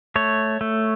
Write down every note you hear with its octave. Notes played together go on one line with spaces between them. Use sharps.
A3 C#5
A3